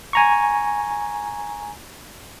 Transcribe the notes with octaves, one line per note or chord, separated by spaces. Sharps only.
G#5 A#5 C#6